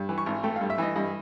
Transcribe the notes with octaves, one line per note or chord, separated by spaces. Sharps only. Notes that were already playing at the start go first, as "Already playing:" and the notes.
Already playing: G2
E3
C#6
G#1
A3 G5
F5
G2
E5
E3 D#5
G2 D#5